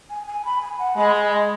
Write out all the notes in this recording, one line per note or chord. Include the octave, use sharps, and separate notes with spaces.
G#5
G#5
B5
G#5
F#5
G#3 B5
G#5
D#5